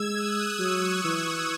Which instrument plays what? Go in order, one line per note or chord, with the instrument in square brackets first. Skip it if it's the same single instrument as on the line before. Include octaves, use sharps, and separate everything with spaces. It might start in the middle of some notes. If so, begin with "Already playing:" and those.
Already playing: [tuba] G#3 [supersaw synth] E6 G#6
[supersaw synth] D#6 F#6
[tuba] F#3 [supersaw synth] C#6 E6
[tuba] E3